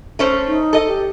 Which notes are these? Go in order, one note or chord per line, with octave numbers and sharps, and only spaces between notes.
A3 C#4 C5
D#4
A4 D#5
G4